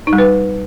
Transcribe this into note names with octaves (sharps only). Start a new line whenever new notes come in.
D#4
G3
B4